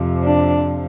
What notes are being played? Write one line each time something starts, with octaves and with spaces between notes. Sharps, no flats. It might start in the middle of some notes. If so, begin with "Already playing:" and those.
Already playing: F2 C3 F3
D4